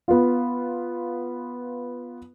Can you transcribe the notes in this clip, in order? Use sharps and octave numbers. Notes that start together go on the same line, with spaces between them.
B3 F4